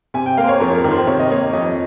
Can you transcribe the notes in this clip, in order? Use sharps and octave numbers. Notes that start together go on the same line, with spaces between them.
C3 G#5
G5
A#3 F5
C5
C#5
F2 A#4
A#4
D#3
C5
C3 C#5
D#5
A#3 C#5
F2 D#5